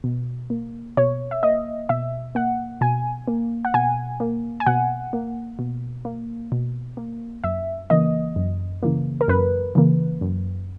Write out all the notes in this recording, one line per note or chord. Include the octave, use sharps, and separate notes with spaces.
B2
A#3
B2 C#5
E5
A#3 D#5
B2 E5
A#3 F#5
B2 G#5
A#3
F#5
B2 G#5
A#3
G#5
B2 F#5
A#3
B2
A#3
B2
A#3
F#2 E5
C#3 E3 A#3 D#5
F#2
C#3 E3 A#3
A#4
F#2 B4
C#3 E3 A#3
F#2